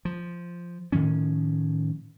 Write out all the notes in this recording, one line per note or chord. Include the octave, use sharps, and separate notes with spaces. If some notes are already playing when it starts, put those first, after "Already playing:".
F3
A2 D#3 F3 C#4